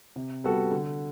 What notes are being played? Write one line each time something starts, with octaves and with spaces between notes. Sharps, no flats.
C3
G3 B3 F#4 A4
D3